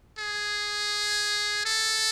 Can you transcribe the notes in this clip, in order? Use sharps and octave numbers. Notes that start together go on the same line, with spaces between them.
G#4
A4